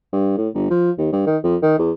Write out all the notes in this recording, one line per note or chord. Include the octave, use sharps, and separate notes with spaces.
G2
A2
G1
F3
D#2
G2
D#3
F2
D#3
E2